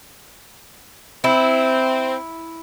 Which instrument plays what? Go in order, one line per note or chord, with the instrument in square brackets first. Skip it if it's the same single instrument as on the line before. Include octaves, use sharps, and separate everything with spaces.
[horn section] C4 [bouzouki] E4